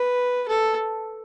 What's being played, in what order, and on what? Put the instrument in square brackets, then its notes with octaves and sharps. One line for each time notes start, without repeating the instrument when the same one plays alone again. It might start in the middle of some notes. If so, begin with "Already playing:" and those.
Already playing: [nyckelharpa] B4
A4